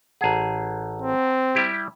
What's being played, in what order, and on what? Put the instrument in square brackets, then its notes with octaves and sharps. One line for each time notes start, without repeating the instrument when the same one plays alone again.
[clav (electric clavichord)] A1 G#4 [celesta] F#5 A5 A#5
[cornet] C4
[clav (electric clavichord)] G3 E4 G4